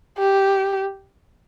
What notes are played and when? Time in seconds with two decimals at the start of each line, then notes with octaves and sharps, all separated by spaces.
0.19 G4